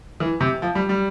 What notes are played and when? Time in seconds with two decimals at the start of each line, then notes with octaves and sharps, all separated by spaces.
0.20 E3
0.40 C3
0.62 F3
0.75 G3
0.89 G3